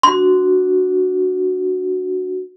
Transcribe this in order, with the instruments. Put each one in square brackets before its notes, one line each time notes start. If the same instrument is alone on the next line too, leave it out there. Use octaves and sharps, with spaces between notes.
[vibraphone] D4 F#4 [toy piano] C6